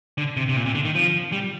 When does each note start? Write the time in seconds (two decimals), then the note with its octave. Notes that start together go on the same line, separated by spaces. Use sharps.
0.18 D3
0.37 C3
0.49 C3
0.57 A#2
0.66 C3
0.75 D3
0.85 D#3
0.95 F3
1.32 G3